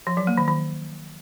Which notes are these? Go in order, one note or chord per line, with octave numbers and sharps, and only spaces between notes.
F3
F#3
A#3
D#3
D#3